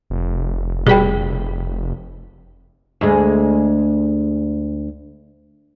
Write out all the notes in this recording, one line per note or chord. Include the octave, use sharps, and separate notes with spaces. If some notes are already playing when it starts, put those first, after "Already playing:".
F1
B2 G3 G#4 G5 B5
D2 G#3